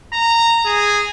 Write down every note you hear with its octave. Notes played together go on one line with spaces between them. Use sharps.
A#5
G#4